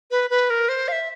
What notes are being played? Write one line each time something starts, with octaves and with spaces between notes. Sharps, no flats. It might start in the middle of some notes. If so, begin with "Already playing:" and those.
B4
B4
A#4
C5
F5
E5